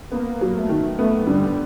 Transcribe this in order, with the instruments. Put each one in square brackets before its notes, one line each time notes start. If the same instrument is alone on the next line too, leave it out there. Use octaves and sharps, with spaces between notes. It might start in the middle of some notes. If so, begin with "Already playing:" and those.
[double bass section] A#3 [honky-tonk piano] B3
[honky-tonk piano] F#3
[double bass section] A3
[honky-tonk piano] D#3
[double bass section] A3 [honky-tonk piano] B3
[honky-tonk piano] D3 [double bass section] G3